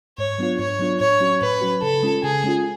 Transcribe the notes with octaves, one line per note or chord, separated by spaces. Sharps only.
G#2 C#5
F#3 B3 D4 F4
G#2 C#5
F#3 B3 D4 F4
A2 C#5
F#3 C#4 F#4
A2 B4
F#3 C#4 F#4
C#3 A4
G#3 C#4 F4
C#3 G#4
G#3 C#4 F4